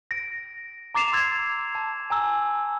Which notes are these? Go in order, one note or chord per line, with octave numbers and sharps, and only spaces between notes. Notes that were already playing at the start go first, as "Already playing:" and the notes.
A#6 D7
A#5 D6 A6 C7 E7 F7
C6 E6 G#6 A6
A5
G#5 A#5 E6